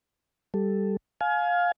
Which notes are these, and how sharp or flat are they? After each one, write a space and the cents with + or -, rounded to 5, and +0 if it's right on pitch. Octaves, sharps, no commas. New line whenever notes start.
G3 +5 A4 +0
F5 +15 G#5 +30